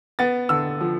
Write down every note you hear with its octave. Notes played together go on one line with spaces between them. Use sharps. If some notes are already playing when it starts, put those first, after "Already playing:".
B3 A6
D3 E6
F3